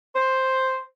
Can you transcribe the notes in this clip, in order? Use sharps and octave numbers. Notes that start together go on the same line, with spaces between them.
C5